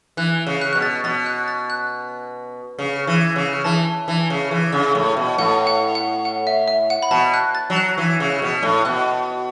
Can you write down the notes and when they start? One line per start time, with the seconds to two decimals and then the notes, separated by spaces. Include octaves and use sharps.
0.17 E3 F#6
0.47 C#3
0.61 F#6
0.73 B2 F#6
0.82 A6
1.04 B2 A6
1.26 F#6
1.48 A6
1.70 F#6
2.79 C#3
3.07 E3
3.36 C#3
3.64 E3 A5
4.08 E3
4.30 C#3
4.51 E3
4.72 C#3
4.95 A2
5.17 B2
5.38 A2 F#5
5.67 F#5
5.95 F#5
6.25 F#5
6.47 E5
6.68 E5
6.90 F#5
7.02 B5
7.11 B2 A5
7.34 F#6
7.55 A6
7.70 F#3
7.76 F#6
7.98 E3
8.20 C#3
8.42 B2
8.63 A2
8.85 B2 F#6